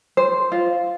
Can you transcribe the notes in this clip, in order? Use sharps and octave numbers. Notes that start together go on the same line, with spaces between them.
C5
F4